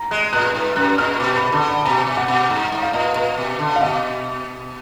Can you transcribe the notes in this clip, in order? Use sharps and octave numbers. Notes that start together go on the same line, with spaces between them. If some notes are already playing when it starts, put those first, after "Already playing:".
Already playing: A#5
G#3 F#6
A#2 F#6
G#2
F#2 F#6
A#2 F6
B2 D6
B5
D3 D6
B5
B2 A#5
B2
F#5
B2
G#2 F#5
G#2
F5
A#2 D#5
F5
A#2
B2
D3
F5
B2 D#5